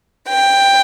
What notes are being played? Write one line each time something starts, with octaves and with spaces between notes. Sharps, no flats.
G5